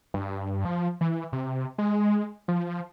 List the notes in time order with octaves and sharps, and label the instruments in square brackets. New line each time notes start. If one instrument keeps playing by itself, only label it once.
[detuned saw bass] G2
F3
E3
C3
G#3
F3